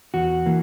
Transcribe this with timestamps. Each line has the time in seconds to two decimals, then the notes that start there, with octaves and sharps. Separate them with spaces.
0.14 E2 F#4
0.46 E3 A#3